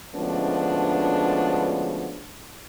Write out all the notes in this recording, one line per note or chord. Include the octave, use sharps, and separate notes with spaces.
D2 F3 G#3 B3 C#4 D4